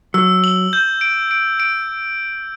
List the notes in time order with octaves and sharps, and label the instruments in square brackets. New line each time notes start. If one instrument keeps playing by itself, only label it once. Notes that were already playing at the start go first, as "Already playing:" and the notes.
[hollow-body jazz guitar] F#3 [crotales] E6
[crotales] F#7
G6
D7
D7
D7